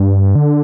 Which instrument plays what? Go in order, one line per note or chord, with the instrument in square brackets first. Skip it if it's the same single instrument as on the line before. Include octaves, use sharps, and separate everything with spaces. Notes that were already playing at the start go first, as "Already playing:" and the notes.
Already playing: [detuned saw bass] G2
D3